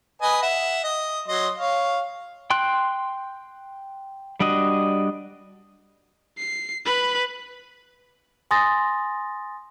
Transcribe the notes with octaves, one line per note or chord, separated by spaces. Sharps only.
B4 D#5 G#5
E5 F#5
D#5
F#3 D#5 C6
C#5 F5
G5 C6 F#6
G3 D4 F#4 D#5
C7
B4 B5
G#5 C6 D#6 A6 A#6